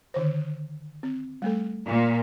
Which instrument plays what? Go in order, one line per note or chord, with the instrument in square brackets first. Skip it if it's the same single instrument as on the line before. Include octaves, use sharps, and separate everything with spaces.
[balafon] D3 D#3 C5
C4
G3 A3 A4
[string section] A#2